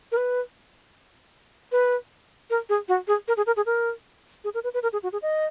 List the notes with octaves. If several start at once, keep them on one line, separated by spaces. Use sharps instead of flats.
A#4
B4
B4
A#4
G#4
F#4
G#4
A#4
G#4
A#4
G#4
A#4
G#4
A#4
B4
B4
A#4
G#4
F#4
G#4
D#5